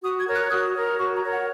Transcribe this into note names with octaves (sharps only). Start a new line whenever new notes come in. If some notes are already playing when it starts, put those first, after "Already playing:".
F#4 D#6
G#6
A#4 C#5
F#6
F#4 D#6
A#4 C#5
F#4 C#6
A#5
A#4 C#5
F#5